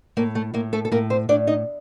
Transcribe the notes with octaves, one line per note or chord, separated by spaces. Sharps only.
A2 A#3
A3
A2 A#3
A3 A4
A4
A2 A#3 A#4
C4 C5
A2 D4 D5
D#4 D#5